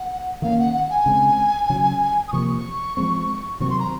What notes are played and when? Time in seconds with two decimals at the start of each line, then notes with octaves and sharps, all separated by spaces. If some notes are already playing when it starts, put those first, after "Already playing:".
Already playing: F#5
0.42 D#3 A#3 C#4 F5
0.59 F#5
0.74 F#5
0.90 G#5
1.06 C#3 G#3 C4
1.70 C#3 F#3 C#4
2.28 D#6
2.33 C3 F3 A#3 C#6
2.97 F3 G#3 C4
3.60 C3 D#3 F#3 C4 C#6
3.70 C6
3.79 A#5